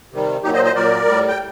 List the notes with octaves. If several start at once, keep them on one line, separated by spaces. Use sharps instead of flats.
C3 D#3 G3
A#2 F#3 D#4 G4
C5 D#5
C5 D#5
A#2 F#3 A#4 D5
A2 G3
G5